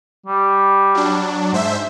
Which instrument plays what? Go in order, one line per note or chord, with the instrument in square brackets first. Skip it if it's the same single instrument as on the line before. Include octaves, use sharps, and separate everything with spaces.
[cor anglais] G3
[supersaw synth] F#3 D4
G#2 C5 E5